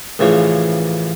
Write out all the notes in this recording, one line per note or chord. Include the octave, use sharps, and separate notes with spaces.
A1 C#3 E3 F3 C#5